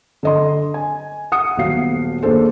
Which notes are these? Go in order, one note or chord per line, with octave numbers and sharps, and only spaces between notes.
D3 D#5 C6
G#5
F#5 D#6 C#7
D#1 B1 F#4 F5 C7
D#2 A#3 D4 G#4 A4 C5